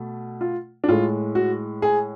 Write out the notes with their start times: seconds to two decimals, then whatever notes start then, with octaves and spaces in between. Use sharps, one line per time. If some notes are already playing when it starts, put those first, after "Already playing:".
Already playing: B2 A3
0.41 F4
0.84 D4
0.88 A2 G#3 F4
1.35 F#4
1.82 G#4